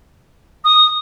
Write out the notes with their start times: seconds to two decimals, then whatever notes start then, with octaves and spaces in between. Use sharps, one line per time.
0.64 D#6